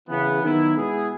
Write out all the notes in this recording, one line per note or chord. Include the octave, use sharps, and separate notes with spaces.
C#3 E3 B3
D#3 F#3 B3 E4
B2 G#3 B3 E4 G#4